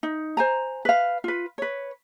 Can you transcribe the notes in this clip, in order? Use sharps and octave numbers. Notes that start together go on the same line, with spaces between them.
D#4
C5 G#5 A#5
B4 F5
F4 B4
B4 C#5